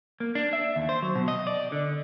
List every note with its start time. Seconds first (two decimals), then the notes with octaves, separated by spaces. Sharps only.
0.20 A#3
0.35 D4
0.53 E5
0.76 D#2
0.89 C5
1.03 F#3
1.15 B2
1.28 D#5
1.47 D5
1.72 D3